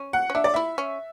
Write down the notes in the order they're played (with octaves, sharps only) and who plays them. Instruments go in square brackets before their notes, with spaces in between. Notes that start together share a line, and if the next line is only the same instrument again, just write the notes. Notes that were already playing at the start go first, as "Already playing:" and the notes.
Already playing: [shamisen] C#4
[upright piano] F#5
[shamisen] C#4
[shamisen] D4 [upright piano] E5
[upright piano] D5
[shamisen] E4 [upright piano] E5
[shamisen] C#4